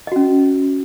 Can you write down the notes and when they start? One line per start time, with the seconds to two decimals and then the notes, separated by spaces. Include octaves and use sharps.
0.07 D#5
0.12 F#4
0.16 C#4